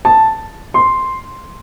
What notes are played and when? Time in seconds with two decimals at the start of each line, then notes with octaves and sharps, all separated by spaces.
0.05 A5
0.74 C6